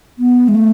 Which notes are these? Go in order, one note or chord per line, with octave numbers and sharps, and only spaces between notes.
B3
G#3
A3